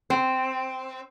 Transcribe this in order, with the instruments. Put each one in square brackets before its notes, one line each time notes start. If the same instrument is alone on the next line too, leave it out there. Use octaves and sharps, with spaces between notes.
[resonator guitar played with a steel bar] C4